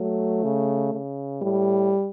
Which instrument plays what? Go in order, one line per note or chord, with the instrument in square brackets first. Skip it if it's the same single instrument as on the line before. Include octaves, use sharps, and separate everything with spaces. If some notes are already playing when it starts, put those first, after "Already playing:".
Already playing: [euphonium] F#3 [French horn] A3
[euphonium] C#3
C#3
[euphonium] A2 [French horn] G3